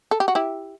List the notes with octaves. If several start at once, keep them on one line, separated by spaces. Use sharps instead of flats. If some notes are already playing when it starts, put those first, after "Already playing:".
A4
G4
F#4
E4 G4